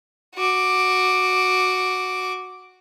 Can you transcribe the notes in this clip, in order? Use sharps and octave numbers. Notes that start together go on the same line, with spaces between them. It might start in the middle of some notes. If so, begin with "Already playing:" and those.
F#4 D6